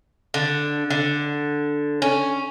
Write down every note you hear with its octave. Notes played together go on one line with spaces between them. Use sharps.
D3
D3
C#4